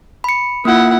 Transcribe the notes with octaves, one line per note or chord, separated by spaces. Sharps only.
B5 C#7
A#3 E4 F4 F#5